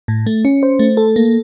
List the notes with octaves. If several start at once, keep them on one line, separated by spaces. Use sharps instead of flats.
A2
A3
C#4
C5
A3
A4
A#3